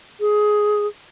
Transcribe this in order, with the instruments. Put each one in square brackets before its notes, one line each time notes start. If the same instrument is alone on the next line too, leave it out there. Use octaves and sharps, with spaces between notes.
[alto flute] G#4